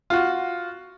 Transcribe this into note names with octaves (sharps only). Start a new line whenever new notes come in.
F4 F#4